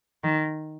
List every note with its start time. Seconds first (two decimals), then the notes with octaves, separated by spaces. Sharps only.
0.24 D#3